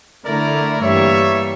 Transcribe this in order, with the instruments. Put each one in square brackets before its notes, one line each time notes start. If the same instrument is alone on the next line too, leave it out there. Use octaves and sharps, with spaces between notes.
[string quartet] D3 A3 E4 [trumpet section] A#4 D5
[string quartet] G2 E3 G3 A#3 [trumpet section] C#5 E5